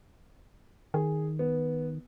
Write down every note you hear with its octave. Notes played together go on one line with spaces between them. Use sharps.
D#3 G#4
B3